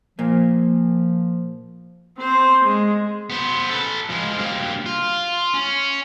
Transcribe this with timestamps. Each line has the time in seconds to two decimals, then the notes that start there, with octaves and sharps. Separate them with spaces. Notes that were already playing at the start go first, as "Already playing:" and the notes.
0.19 A#2 F3 A#3
2.18 C4 C5
2.64 G#3
3.30 B3 C5
3.71 A4 B4
4.10 F3 G#3
4.38 G2 A#3
4.86 F4
5.54 C#4